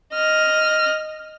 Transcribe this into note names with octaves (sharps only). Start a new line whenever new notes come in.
D#5 F6